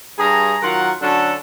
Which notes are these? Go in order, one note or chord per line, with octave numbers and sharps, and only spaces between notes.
G2 G#4 A#5
D#3 F#3 F4 A#4 F#5
D3 F#3 C#4 D4 F#4 A4